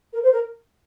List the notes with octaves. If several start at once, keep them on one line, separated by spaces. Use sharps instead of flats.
A#4
C5
A#4